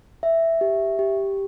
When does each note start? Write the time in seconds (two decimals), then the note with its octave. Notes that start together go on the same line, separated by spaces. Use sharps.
0.23 E5
0.61 G4
0.99 G4